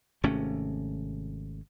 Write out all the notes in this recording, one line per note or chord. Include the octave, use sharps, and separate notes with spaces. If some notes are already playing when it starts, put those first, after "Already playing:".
G#1 C3 A3 C#4